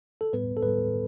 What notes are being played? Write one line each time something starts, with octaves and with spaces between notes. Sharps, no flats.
A4
A2 G3 B3 B4
A4
A2 G3 B3 B4